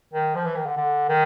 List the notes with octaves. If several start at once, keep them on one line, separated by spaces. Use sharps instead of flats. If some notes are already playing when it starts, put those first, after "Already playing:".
D#3
F3
E3
D#3
D3
D3
D#3